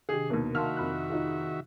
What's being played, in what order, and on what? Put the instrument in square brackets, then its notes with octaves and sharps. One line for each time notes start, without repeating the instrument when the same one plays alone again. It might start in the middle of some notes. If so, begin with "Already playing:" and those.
[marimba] C3 D#3 D4 [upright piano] G4 G#4
[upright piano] D#2 B2 [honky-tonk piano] A#3
[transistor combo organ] D#3 F#4 E5 [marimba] F5 A5 C6 [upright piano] F6
[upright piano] F2 B5 F#6
[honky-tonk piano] D#4 F4 G#4